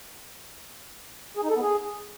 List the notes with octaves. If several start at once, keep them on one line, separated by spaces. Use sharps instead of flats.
G#4
D#4
A4
B3
G#4